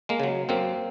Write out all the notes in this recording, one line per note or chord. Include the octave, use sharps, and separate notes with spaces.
G#3 A#3
C#3 F#3
F#2 A#3 C4